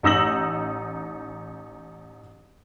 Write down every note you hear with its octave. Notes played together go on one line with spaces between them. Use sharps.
A1 D#4 E6 A#6 F#7